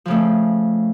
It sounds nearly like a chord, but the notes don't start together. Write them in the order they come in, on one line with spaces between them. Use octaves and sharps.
F3 C#3 A3